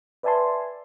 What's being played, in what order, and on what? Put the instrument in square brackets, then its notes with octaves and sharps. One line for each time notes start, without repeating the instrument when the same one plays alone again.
[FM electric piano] B4 D5 E5 G#5 A5 C6